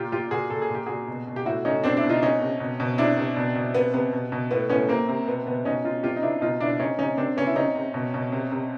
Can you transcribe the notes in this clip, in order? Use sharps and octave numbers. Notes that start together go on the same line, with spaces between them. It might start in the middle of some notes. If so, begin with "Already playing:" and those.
Already playing: A#2 F4 G4
A#2 F4 G4
A#2 F#4 G#4
A#2 A4
G#4
A#2 G4
A#2 F#4 G#4
B2
B2
G4
A2 E4 F#4
A2 C#4 D#4
B2 C4 D4
D4 E4
B2
D#4 F4
C3 C#4 D#4
C3
B2
B2
C3 D4 E4
C3
B2
B2
C3 B3
C3 B3
B2
B2
A2 B3
A2 B3 C#4
C3 A#3 C4
C3
B2 B3
B2 B3
B2 C#4 D#4
B2 D#4 F4
C3 F4 G4
D#4
C3 D4 E4
B2 D#4 F4
B2 D4 E4
C3 C#4 D#4
C3 C#4 D#4
C3 C4 D4
C3 B3 C#4
E4
C3 C#4 D#4
C3
B2
B2
C3
C3